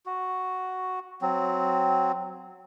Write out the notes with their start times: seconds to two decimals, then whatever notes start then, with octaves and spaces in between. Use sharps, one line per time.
0.06 F#4
1.22 F#3 C4